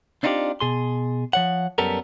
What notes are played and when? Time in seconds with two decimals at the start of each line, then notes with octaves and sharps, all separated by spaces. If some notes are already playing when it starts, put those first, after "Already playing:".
0.23 C4 D4 D#4 F4 G4 D5
0.61 B2 G#4 C6
1.33 F3 C#5 F#5
1.78 F#2 G3 B3 C#4 A4 A#4